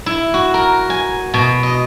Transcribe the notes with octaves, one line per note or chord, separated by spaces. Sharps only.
E4
F#4
A#4
G#5
B2
D#5